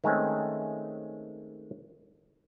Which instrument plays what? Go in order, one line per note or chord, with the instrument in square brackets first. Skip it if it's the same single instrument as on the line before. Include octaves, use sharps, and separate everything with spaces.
[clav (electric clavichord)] D#3 G#3 A3 C4 C#4